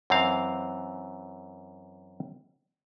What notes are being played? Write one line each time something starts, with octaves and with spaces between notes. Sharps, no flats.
F#2 E3 C4 F5